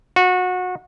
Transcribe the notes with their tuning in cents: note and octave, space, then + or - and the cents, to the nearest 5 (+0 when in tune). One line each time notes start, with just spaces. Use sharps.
F#4 -25